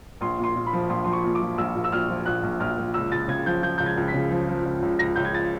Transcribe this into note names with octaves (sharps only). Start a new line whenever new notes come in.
A#1 C6
A#2
C6
A#2
B5
F3
A#1 C6
F3 C6
C#6
A#2
D6
F3
A#1 E6
A#1
E6
A#1 F6
F3
A#1 F#6
A#1
A#1 F6
A#1
C#2 E6
C#2 A6
C#3 G#6
F3 G6
F3 G6
C#2 G6
G#6
C#2
B6
C#3
F3
F3
C#2
C#2
C#2 A#6
C#2 G6
G#6
A6